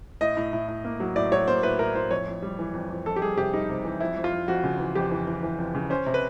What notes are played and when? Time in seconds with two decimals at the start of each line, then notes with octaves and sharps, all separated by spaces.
0.21 A2 D#5
0.37 A2
0.53 A2
0.68 A2
0.84 A#3
1.00 F#3
1.16 A2 D5
1.32 F#3 C#5
1.48 A#3 C5
1.63 A2 B4
1.79 A2 A#4
1.95 A2 C5
2.11 F2 C#5
2.27 F2
2.42 G3
2.59 E3
2.74 F2
2.90 F2
3.06 F2 A4
3.16 G4
3.22 G3 G#4
3.37 C3 G4
3.53 G3 D#4
3.69 C3
3.85 E3
4.00 F2 E4
4.16 F2
4.24 F4
4.33 F2
4.48 F2 F#4
4.64 C#3
4.80 E3
4.95 F2 G4
5.11 E3
5.27 E3
5.43 E3
5.59 F2
5.75 C#3
5.90 C#4 C5
6.06 C3
6.14 B4